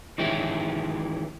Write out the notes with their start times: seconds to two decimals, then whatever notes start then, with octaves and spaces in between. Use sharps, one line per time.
0.18 D#3 E3 G#3 C#4 E4 G4